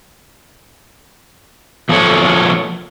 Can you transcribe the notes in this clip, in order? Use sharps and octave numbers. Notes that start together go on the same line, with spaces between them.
F3 A#3 B3 A4 C#5